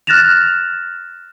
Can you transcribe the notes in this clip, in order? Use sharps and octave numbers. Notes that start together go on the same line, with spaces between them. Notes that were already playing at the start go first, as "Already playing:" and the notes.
F6 F#6 A6 A#6 E7 F7